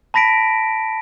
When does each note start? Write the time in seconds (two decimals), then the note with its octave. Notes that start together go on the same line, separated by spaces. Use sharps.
0.14 A5 B5 A#6 B6 D7